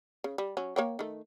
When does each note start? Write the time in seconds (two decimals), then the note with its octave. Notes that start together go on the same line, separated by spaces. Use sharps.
0.24 C#3
0.38 G3
0.57 F#3 C#4
0.76 A#3 C#5 G5
0.99 D#3 A3